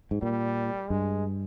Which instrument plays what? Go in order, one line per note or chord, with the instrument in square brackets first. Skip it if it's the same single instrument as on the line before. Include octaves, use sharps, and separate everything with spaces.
[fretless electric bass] G#2
[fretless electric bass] A#2 [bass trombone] G3
[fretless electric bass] G2 [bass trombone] G#3